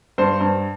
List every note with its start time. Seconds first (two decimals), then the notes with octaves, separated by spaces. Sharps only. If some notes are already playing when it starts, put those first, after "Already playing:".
0.18 G2 C5
0.41 G2